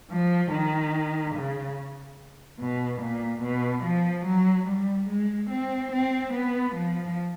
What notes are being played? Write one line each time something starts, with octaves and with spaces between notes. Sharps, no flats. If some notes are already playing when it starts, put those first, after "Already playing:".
F3
D#3
C#3
B2
A#2
B2
F3
F#3
G3
G#3
C4
C4
B3
F3